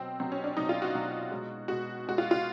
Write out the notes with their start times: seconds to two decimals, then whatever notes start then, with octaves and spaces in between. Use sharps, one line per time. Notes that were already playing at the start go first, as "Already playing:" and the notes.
Already playing: B2 F#3 C4
0.20 B2 F#3 C4
0.32 C#4
0.44 D4
0.57 B2 F#3 D#4
0.69 F4
0.82 F#4
0.94 B2 F#3
1.31 B2 G#3
1.68 B2 G#3 F#4
2.06 B2 G#3 F#4
2.18 F4
2.31 F4